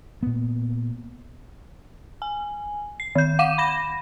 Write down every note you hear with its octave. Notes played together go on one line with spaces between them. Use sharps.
A#2 B3
G#5
C7
D#3 G6
F5 F#5 D6 D#7 E7
B5 A#6 E7